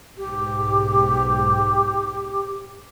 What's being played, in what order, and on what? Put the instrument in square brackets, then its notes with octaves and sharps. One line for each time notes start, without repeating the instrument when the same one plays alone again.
[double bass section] B1 G#2 [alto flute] G4